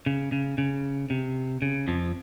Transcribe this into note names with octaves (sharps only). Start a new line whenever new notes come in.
C#3
C#3
C#3
C3
C#3
F2 F3